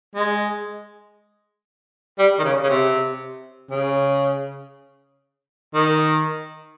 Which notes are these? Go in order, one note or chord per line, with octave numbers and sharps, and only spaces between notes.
G#3
G3
D#3
C#3
C#3
C3
C#3
D#3